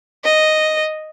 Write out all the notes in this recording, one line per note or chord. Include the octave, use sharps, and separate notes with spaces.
D#5